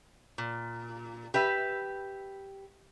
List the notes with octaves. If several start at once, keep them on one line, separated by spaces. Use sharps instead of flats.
A#2
G4 B4 E5